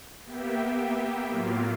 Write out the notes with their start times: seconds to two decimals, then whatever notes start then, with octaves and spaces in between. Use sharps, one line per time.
0.25 A#3 B3 G4 E5 G5
1.26 A2 F#3 A#3 F4